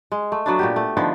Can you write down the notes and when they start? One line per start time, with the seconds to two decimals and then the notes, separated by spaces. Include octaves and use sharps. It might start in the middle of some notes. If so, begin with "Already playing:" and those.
0.12 G#3
0.32 A3
0.46 F#3 B3 D4
0.59 A#2 B3 G4
0.76 A3
0.97 D3 D#3 F3 B3